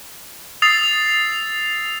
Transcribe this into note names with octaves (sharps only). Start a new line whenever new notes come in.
D#6 E6 A6 C7 F7